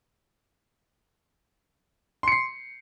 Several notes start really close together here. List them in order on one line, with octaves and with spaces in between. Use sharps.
C6 C#7 C7